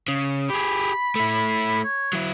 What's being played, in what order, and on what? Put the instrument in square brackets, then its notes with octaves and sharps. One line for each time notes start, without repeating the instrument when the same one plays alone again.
[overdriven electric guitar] C#3
[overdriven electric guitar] G4 G#4 [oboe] B5
[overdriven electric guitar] A3 E4
[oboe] C#5
[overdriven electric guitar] F#3 E4